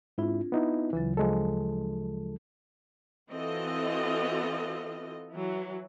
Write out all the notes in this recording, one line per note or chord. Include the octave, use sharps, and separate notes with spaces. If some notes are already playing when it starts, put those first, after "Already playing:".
G#2 C4 D4 E4 F4
B3 D#4 E4
D2 C#3 E3 F#3
F3 G#3 A4
E3 C4 F4 F#4 A4 D#5
E3 F#3